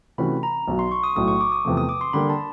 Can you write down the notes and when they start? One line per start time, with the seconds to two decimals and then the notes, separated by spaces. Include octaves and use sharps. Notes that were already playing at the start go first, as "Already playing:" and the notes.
0.18 C3 E3 A3 C#4 F#4 B5
0.43 A#5
0.68 B1 B2 F#3
0.79 C6
0.92 C#6
1.04 D#6
1.16 B1 A2 F#3 A3 D#6
1.28 C#6
1.41 D6
1.52 D#6
1.65 E2 C3 F3 A3
1.77 D#6
1.89 D6
2.01 C6
2.13 D3 G3 A#3 B5
2.30 A5